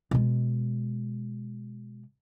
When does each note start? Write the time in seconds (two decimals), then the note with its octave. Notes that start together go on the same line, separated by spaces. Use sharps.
0.11 B2 G#3